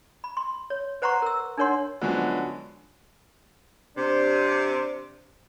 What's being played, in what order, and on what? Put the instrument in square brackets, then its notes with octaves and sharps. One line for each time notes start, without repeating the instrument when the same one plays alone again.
[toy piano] B5
C6
C#5
B4 C5 F#5 A#5 C6 C#6
A#4 E6
D4 D#4 A#4 C#5 F#5 C6
[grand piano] D3 F3 F#3 G#3 B3 C#4
[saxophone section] C3 D4